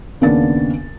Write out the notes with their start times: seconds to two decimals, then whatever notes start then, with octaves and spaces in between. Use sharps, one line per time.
0.21 D#2 C#3 A#3 B3 D4 A6